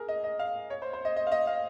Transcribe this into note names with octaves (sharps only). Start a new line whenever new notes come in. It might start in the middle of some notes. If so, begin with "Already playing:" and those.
Already playing: G#4 A#4
D#5
D#5
F5
C#5
C5
C5
D#5
D#5
F5
D#5
F5